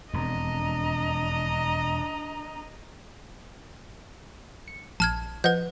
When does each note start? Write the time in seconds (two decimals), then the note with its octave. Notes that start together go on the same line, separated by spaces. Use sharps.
0.13 E1 F2 D4 D#5 A#5
4.68 C#7
5.00 A#1 A5 F6 G#6
5.44 F3 B4 D#5 F#5 G6